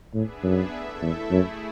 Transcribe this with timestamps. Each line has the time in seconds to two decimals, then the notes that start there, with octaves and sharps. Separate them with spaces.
0.14 A2 B3 D4 G#4 B4 E5
0.43 F#2
0.73 A3 E4 A4 E5
1.02 E2
1.31 F#2 A3 E4 G#4